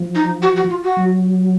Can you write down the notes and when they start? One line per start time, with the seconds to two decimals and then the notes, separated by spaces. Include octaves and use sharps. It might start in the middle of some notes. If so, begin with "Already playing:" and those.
Already playing: F3
0.15 D#4
0.42 F#4
0.56 F#4
0.70 F4
0.84 F#4
0.97 F#3